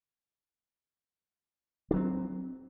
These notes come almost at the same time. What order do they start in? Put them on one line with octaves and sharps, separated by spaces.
D4 F#3 C4